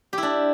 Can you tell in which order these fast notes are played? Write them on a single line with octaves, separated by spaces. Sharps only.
G4 E4 D4